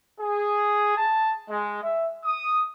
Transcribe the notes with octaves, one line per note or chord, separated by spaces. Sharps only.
G#4
A5
G#3
E5
D#6